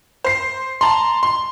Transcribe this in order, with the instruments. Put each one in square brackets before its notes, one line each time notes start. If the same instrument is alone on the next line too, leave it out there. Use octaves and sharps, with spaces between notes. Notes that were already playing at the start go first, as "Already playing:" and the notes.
[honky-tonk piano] C5 C7
A5 A#5 C6
C6